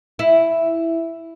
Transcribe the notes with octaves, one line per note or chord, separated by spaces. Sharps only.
E4